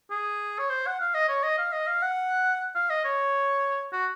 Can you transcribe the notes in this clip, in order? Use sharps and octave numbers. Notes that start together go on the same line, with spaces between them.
G#4
C#5
C5
F#5
F5
D#5
C#5
D#5
F5
D#5
F5
F#5
F5
D#5
C#5
F#4